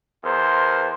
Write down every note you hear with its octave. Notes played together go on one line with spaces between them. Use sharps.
E2 A#4 C5